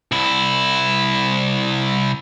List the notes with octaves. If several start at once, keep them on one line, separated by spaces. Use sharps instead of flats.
C2 E4